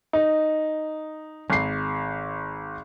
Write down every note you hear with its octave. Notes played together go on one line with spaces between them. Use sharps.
D#4
G#1 C7